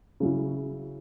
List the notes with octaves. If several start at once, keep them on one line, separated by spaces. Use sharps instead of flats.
C#3 F#3 C#4 E4